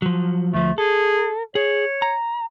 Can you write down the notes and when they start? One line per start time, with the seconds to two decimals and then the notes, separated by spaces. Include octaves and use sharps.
0.02 F3 F#3
0.54 D2 F3 A3
0.78 G#4 A4
1.55 G#4 C#5
2.02 A#5